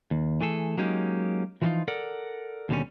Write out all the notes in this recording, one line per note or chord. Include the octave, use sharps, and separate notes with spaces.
D#2
E3 A3 G#4 A4
F#3 G#3 A#3 C#4 D#4 G4
E3 F3 G3 A#3 D#4 F4
A4 A#4 D5 F#5
D#2 B2 D3 G3 C#4